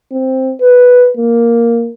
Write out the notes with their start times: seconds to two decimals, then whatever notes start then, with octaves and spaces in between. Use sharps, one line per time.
0.11 C4
0.61 B4
1.17 A#3